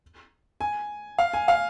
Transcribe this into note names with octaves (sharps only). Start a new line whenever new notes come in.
G#5
F5
G#5
F5